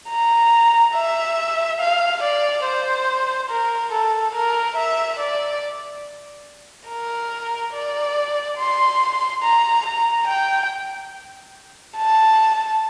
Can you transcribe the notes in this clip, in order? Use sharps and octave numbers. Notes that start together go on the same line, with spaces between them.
A#5
E5
F5
D5
C5
A#4
A4
A#4
E5
D5
A#4
D5
C6
A#5
A#5
G5
A5